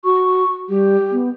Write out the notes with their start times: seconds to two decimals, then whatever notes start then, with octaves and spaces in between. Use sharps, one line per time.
0.04 F#4 C#6
0.69 G3 G4
1.12 B3